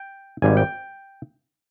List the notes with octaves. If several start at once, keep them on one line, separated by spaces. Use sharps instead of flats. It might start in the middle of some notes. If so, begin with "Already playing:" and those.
Already playing: G5
G#1 G#2 G3 G#5
G5